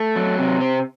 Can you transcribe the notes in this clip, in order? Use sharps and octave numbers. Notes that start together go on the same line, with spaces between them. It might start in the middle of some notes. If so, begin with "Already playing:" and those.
Already playing: A3
F#3
C3
C4